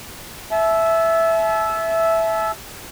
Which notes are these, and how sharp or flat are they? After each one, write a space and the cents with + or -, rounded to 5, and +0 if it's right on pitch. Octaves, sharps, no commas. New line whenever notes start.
E5 +0 A5 -40